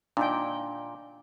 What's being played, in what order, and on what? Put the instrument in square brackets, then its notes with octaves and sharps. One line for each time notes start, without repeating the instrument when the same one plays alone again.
[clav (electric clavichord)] A#2 [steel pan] D4 D#4 G5